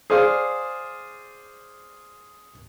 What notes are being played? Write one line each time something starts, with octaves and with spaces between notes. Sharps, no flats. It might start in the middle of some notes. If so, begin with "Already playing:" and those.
G#4 C5 D5 F5